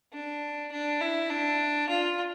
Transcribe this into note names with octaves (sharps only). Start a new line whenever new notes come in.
D4
D4
E4
D4
F4